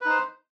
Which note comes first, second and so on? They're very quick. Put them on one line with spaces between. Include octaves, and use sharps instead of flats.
B4 D#4 C5